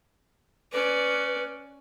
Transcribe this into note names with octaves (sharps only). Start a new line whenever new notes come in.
C#4 B4 D5